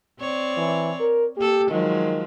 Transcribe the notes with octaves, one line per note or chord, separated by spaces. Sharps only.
C4 C#5 D5
E3
A#4
A#3 G4 A4
D#3 F3 F#3 G#3